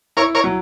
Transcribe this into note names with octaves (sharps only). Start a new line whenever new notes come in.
E4 A#4 C#5
A#4 C#5
F#3